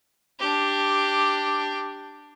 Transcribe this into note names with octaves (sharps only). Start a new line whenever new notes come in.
D4 G4